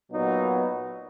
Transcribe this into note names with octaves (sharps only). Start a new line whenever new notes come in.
A#2 F#3 B3 D#4